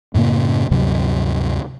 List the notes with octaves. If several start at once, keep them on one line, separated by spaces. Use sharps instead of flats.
F#2 A2 C#3 A#3
D2 G2 C3 F#3